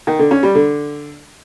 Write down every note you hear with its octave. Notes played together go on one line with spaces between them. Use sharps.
D#3
D3
C#4
G3
D3